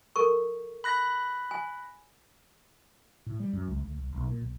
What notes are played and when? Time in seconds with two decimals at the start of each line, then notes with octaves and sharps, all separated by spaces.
0.16 A4 A#4 C#6
0.84 B5 F#6 A#6
1.51 G#5
3.26 A2
3.40 G3
3.53 F#2
3.68 C#2
3.84 D2
3.98 C2
4.13 B1
4.28 A#2
4.40 B1